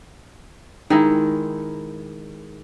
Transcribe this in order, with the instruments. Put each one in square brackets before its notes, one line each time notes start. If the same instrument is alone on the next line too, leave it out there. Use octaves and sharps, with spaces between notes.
[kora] D#3 G#3 E4